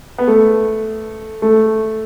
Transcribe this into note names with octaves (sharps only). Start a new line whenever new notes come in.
B3
A3
A3